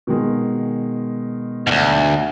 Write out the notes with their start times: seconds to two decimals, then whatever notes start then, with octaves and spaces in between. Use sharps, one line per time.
0.07 B2 D#3 G#3
1.67 D2 G#2